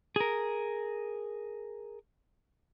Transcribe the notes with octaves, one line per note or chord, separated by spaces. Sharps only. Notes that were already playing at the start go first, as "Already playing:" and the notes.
G#4 A#4